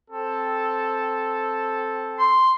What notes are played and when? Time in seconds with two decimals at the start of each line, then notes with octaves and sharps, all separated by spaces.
0.11 C4 A4
2.18 C6